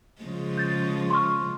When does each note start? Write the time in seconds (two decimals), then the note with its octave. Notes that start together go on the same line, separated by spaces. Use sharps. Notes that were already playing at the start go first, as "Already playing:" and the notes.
0.22 C#3 F3 G#3
0.57 G6 A6
1.10 C6 C#6 F6